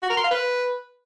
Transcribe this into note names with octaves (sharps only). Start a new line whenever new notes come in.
F#4
A#4
C6
F5
B4